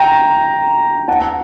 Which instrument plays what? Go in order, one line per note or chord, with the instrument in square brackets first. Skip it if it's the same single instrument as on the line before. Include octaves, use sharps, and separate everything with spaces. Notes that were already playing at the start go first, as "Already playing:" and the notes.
Already playing: [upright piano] G5 A#5
F#5 A5